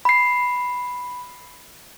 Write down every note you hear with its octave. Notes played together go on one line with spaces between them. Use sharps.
B5 C7